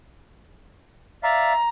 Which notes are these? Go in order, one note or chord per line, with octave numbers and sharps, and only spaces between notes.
D5 E5 F5 A#5